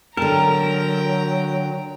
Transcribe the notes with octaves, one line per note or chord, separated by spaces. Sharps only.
D3 F#3 A#4 G5 A5 A#5